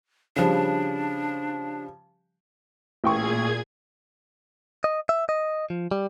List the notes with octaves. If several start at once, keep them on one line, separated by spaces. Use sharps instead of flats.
C#3 F3 G3 D4
A1 A#2 G#4 G5 C#6 G#6
D#5
E5
D#5
F3
G3